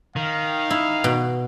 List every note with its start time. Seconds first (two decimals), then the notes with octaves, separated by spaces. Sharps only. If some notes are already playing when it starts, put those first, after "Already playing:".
0.16 D#3 F5
0.71 E4
1.04 B2